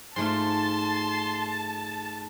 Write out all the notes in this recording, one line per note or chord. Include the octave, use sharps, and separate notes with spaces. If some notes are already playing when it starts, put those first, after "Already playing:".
G#2 A3 F4 A5 C6